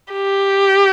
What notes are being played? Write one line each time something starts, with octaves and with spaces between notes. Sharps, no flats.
G4